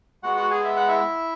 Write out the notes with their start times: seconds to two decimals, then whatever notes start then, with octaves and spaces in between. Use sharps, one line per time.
0.23 G#3 B3 F#4 F#5
0.37 F#4 F#5
0.51 G#4 G#5
0.64 E5
0.76 F#5
0.88 E4 E5